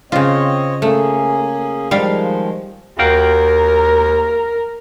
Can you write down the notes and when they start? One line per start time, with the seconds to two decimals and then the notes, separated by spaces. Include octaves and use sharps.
0.12 C#3 C4 F4 C#5 D#5
0.82 A3 A#3 C#4 G#4
1.91 D#3 F3 G3 G#3 F5
2.99 D#2 F#4 A#4 F5 G5